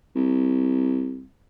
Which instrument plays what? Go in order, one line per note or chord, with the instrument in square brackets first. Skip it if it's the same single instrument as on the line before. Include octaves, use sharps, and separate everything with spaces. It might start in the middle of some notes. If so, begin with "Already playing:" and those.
[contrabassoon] C2